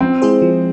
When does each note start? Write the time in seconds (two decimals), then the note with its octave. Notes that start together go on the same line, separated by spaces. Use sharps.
0.01 F3 C4
0.22 G#3 E4 G#4 C5
0.42 F3